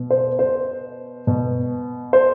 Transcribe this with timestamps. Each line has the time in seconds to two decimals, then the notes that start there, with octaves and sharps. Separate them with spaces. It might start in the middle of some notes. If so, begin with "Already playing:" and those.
Already playing: B2
0.11 C5
0.39 C5
1.27 B2
2.13 C5